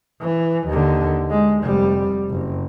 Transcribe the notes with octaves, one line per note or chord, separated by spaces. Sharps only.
E3
D#2 D3
G#3
F1 G3
F#1